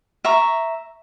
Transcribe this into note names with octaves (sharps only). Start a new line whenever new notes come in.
E5 A#5 C#6